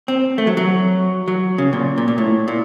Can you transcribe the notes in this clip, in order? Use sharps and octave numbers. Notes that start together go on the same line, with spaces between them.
C4
A3
F#3
F#3
F#3
C#3
A#2
A#2
A#2
A2
A#2